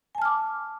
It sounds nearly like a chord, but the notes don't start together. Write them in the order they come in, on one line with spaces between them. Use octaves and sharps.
G#5 A5 F6 D6